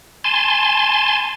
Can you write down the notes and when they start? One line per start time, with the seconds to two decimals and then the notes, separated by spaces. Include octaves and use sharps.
0.24 G#5 A5 C6